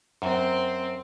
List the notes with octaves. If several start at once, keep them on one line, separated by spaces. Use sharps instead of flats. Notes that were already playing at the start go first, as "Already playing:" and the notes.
F#2 C4